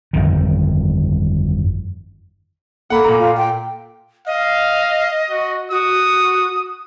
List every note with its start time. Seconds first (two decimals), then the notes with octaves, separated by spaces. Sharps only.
0.13 G1 F2 D#3
2.90 A#3 A4 F#5 B5
3.04 A#2 A#5
3.19 F4
3.37 G5
4.27 D#5 F5
5.30 F#4
5.71 F#4 D#6